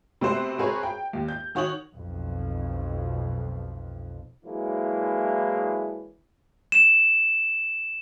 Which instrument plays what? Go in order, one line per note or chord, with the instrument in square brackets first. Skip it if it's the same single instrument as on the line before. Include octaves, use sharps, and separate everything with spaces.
[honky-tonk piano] C3 A3 B3 C4 F#4 C5
C4 F#4 G#4 A#4 B4 C#5
G5
D#2
G6
D#3 F#4 C#5 D#6 F#7
[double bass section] B1 F2
[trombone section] E3 F#3 G#3 A#3 D4 E4
[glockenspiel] E7